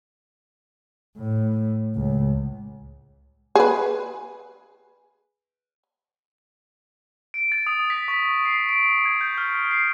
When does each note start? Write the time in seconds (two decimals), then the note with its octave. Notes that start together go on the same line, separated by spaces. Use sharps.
1.17 A2
1.95 C#2
3.56 G#4 B4
7.34 D7
7.52 A6
7.67 D#6
7.90 B6
8.08 C#6
8.45 C7
8.69 D7
9.05 G#6
9.21 G6
9.38 F6
9.71 C7